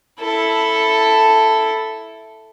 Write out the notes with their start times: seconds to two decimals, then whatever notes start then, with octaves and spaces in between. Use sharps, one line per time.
0.21 E4 A4